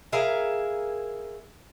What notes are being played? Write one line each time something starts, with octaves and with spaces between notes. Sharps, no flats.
E4 G#4 A#4 F5